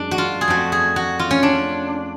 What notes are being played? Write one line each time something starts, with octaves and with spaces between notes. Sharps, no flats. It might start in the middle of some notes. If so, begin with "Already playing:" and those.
Already playing: F#2 G#3 D4
F#4
F4
G#4
F2 F3 A3 F#4
G#4
F#4
F4
C#4
D4